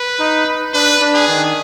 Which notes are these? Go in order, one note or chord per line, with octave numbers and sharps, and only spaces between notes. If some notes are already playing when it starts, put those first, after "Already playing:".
Already playing: B4
D#4
D4 B4
D4
G#4
D#3